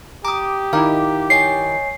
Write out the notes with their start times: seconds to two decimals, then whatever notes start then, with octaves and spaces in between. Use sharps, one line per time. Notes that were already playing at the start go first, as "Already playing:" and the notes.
0.25 G4 A#5 D6 D#6
0.73 D#3 D#4 E4 F5 A#5 D6
1.30 C#5 D#5 G#5 C7